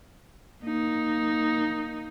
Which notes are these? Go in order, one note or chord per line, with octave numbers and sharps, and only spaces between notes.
A#3 D#4